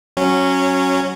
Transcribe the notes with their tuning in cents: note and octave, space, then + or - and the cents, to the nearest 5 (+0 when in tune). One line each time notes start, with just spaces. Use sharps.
F#3 +0 C#4 -10